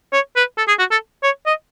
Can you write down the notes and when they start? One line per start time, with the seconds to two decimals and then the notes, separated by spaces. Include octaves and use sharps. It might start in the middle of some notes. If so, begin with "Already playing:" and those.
0.13 C#5
0.36 B4
0.58 A4
0.68 G#4
0.79 F#4
0.91 A4
1.23 C#5
1.46 D#5